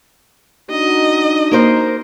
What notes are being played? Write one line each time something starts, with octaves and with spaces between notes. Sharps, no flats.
D4 D#4 F#4 D#5
A#3 A#4 C5